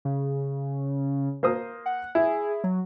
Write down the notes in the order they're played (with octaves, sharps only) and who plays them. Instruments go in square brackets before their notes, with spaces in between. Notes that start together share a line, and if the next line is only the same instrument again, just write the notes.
[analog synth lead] C#3
[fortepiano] A#3 C5 D#6
[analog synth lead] F#5
[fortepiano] E4 [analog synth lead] G#4
[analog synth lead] F#3